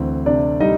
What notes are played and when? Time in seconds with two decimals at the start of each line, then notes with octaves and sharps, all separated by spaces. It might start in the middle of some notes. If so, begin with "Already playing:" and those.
Already playing: D2 E3 C4
0.26 C3 D4 D5
0.60 G3 D#4 D#5